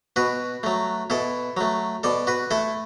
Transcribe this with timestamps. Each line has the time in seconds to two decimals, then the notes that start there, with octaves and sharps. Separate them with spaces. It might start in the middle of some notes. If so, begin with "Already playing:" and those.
0.16 B2 F#4 B4
0.63 F#3 A3
1.10 B2 E4 A4
1.57 F#3 A3
2.03 B2 A4 D5
2.27 F#4 B4
2.51 A3 E4 A4